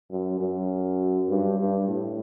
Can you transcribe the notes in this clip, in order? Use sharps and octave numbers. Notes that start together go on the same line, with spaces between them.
F#2
F#2
G2
G2
A2